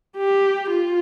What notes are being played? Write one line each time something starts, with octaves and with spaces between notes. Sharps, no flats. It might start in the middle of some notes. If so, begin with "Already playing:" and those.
G4
F4